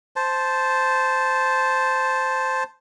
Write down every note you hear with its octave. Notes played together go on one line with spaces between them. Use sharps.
C5 A5